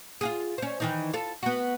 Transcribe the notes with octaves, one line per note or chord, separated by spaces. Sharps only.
F4 F#4 G#4
C#4 C5
D#3 E3 D#4
F4 A4
B3 F#4